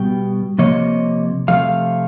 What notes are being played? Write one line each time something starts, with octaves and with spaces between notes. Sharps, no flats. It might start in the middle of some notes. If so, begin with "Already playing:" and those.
Already playing: B2 G3 B3 G5
C3 F3 A#3 C#5 D#5
C3 F3 A3 F5